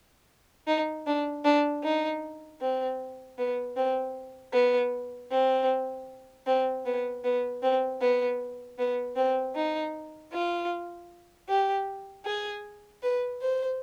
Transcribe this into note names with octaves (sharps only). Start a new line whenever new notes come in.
D#4
D4
D4
D#4
C4
B3
C4
B3
C4
C4
B3
B3
C4
B3
B3
C4
D#4
F4
G4
G#4
B4
C5